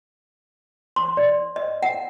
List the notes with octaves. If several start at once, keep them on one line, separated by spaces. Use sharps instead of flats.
C6
D5
D#5
F#5